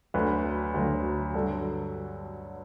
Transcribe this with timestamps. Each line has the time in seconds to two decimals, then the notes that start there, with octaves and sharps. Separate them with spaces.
0.14 D2 D3 F#3 B4
0.74 D2 D3 F#3
1.34 G2 D3 F#3 A4